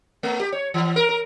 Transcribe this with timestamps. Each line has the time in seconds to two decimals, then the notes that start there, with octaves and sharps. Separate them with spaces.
0.23 A3
0.40 G4
0.52 C#5
0.74 E3
0.96 A#4
1.09 A#4